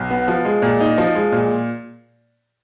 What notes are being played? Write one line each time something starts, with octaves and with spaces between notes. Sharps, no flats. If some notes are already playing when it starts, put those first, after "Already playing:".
Already playing: B1
B3
F3
G#3
A#2
D#4
F3
G#3
A#2